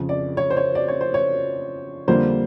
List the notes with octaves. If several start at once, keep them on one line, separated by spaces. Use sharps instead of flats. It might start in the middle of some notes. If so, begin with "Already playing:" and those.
Already playing: F2 C#3 F3
D5
C#5
C5
C#5
D5
C#5
C5
C#5
F2 D3 G3 A#3 C5